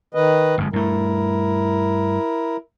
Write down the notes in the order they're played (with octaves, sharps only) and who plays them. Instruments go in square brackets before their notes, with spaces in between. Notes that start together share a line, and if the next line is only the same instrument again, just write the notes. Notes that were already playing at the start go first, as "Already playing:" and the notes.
[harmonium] D#3 B4 D#5
[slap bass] G1 F2 G#3
[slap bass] G2 A3 [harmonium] E4 A#4